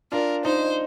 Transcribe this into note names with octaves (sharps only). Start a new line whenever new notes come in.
D4 F4 A#4
D#4 C5